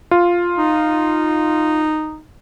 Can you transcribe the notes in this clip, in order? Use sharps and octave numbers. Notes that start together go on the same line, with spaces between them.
F4
D#4